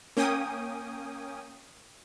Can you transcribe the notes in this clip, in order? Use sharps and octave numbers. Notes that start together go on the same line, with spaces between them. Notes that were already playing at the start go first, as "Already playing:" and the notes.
A#3 C#4 G5 G#5 D#6